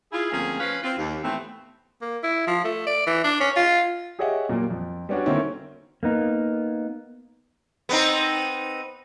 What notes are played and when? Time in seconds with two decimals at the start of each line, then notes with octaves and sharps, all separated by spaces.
0.12 E4 F4 G#4
0.32 D2 F3 A#3 C4 C#4 G#4
0.60 F3 C#4 F4 B4 F5
0.83 C4 F4
0.97 D#2
1.24 A2 E3 A3 B3 C4
2.02 A#3
2.23 E4
2.47 F3
2.65 A3
2.87 D5
3.07 E3
3.24 D4
3.40 C#4
3.56 F4
4.19 G4 G#4 C#5 D#5 E5 F#5
4.49 A#2 F#3 G3 A#3
4.70 F2
5.09 G3 B3 C#4 D4 F#4
5.26 D3 D#3 A#3 C4 C#4 E4
6.03 A#3 B3 D#4
7.89 B3 C4 D#4